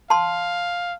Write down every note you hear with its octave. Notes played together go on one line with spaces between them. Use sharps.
F5 A5 C6